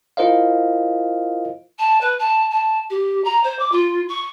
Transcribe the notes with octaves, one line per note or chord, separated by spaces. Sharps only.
E4 F4 A#4 C5 D#5 F5
A5
B4
A5
A5
G4
A#5
C5
D6
F4
C#6